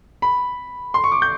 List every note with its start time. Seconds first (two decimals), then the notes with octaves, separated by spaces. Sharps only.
0.22 B5
0.94 C6
1.04 C#6
1.12 D6
1.22 G6